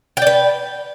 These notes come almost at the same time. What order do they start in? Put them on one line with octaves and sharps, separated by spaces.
G5 D5 B4